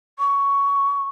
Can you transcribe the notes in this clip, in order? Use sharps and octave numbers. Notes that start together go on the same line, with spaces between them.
C#6